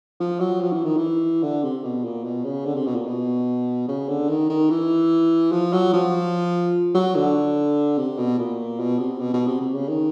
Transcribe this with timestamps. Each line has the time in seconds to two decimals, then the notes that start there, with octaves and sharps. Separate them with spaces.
0.20 F3
0.40 F#3
0.61 F3
0.72 E3
0.85 D#3
0.97 E3
1.43 D3
1.64 C3
1.84 B2
2.05 A#2
2.24 B2
2.44 C#3
2.66 D3
2.75 C3
2.87 B2
2.96 A#2
3.06 B2
3.88 C#3
4.09 D3
4.29 D#3
4.49 D#3
4.70 E3
5.52 F3
5.73 F#3
5.93 F3
6.95 F#3
7.15 D3
7.98 C3
8.18 B2
8.39 A#2
8.80 B2
8.99 C3
9.20 B2
9.34 B2
9.47 C3
9.61 C3
9.74 C#3
9.89 D#3